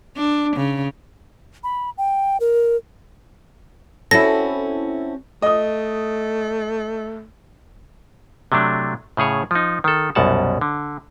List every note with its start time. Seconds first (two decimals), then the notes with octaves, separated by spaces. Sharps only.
0.17 D4
0.57 C#3
1.64 B5
1.98 G5
2.40 A#4
4.11 C4 C#4 E4 F#4 A4 A#6
5.42 A3 D#5 D#6
8.52 C3 F#3 A3 D4
9.17 A2 C#3 G#4 C#5
9.51 F3 D#4
9.84 D#3 A4
10.15 C2 F#2 B2 F#5 A5
10.61 D3